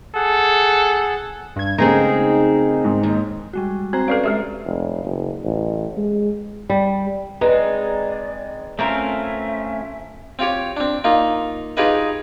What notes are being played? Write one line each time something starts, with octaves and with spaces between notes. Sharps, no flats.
G#4 A4 F#5
G2 G#6
C#3 G#3 A3 C4 D#4 G#4 A#4
G#2
D#2
G3 G#3 F#4
C4 F#4 C5 A#5
C#4 A4 B4 D5 F5 C7
G#3 G4 A4 E5
F1
F#1
A1
G#3
G3
G#3 C4 D#4 B4 D5 A#5
A3 C4 C#4 F4 A#4 E5
C4 F4 G4 C#5
C4 D4
A#3 D#4 F4
D#4 F4 G4 G#4 B4 D#5